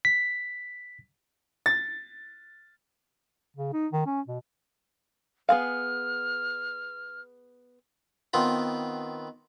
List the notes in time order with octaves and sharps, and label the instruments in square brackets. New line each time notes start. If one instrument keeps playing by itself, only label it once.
[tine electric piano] B6
[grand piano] A6
[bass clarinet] C#3
D#4
D#3
C#4
B2
[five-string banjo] B3 G#4 F5 [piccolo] F6
[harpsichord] D#3 B3 C4 F4